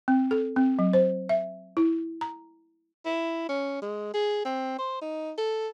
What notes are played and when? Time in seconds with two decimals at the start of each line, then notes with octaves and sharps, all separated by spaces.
0.08 C4
0.31 A4
0.56 C4
0.79 F#3
0.93 C5
1.29 E5
1.77 E4
2.21 A#5
3.05 E4
3.49 C#4
3.82 G#3
4.14 G#4
4.45 C4
4.79 C5
5.02 D#4
5.38 A4